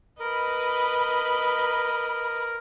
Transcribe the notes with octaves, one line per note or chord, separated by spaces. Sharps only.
A#4 B4 D#5 B5